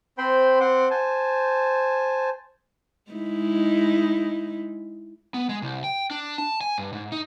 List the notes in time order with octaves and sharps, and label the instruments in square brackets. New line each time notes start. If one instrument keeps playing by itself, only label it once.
[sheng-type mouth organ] C4 C5 G5 B5 C6
C4 F#5 C6 D6
C5 G#5 A5
[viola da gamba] G#3 D#4 E4
[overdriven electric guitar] B3
G#3
C2
G5
D4
A5
G#5
G2
G#2
D#4